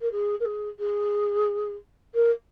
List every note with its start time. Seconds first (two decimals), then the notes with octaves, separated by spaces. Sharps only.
0.01 A#4
0.12 G#4
0.40 A#4
0.45 G#4
0.79 G#4
2.15 A#4